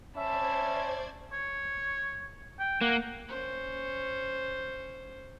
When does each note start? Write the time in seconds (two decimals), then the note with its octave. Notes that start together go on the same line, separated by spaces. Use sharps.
0.16 C#4 C5 D5 E5 A5 B5 G#6
1.32 C#5
2.59 G5
2.81 A#3 F#5
3.28 C#4 C5